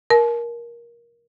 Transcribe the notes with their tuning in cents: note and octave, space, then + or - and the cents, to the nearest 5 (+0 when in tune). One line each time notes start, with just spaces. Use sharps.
A#4 +15 A5 -40